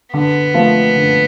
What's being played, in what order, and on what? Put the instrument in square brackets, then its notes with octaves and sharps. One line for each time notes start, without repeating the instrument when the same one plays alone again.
[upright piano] D3 [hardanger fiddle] B3
[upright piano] F3 A3 C4 F4
D3